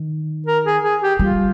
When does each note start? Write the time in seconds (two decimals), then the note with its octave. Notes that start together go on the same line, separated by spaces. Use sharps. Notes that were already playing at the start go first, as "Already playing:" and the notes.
Already playing: D#3
0.46 A#4
0.65 G#4
0.83 G#4
1.02 G4
1.19 G3 F4